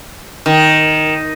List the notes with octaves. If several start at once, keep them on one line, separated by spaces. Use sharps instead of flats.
D#3